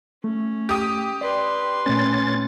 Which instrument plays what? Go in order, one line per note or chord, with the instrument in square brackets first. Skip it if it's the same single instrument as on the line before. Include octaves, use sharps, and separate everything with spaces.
[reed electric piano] A3 [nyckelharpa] C#4
[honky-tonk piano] G4 D#6
[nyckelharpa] B4 C6 [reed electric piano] D5
[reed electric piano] A#2 A3 [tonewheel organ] C#4 A6